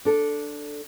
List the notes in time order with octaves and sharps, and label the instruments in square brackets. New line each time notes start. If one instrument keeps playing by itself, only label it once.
[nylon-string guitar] D4 A4